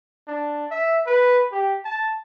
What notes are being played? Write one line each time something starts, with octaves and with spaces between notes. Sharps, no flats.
D4
E5
B4
G4
A5